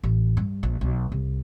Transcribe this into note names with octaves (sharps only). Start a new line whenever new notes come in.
A1
G2
A#1
B1
C2